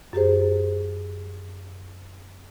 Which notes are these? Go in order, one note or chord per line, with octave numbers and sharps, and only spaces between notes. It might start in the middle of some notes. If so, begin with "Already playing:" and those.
F#2 G4 G#4 C5